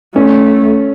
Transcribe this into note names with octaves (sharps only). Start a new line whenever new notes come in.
A3 C#4